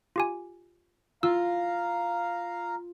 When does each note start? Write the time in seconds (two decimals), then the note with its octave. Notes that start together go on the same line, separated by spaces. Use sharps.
0.16 F4 G4 G#5
1.23 F4 F5 A#5 E6